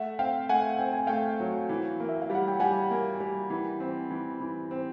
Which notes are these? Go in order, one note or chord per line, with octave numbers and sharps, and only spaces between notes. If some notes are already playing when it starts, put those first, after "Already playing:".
Already playing: A3 E5 F#5
C4 F5 G5
A3 F#5 G#5
C4 G5
G#5
A3 F5 G5
F#3
E3
A#3
E5
F5
G3 F#5
G5
G3 F#5 G#5
A#3
G3
E3
C4
E3
E3
C4